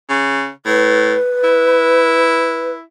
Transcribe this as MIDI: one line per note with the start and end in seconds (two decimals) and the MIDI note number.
0.09 0.49 49
0.65 1.14 45
0.65 2.71 71
1.44 2.82 64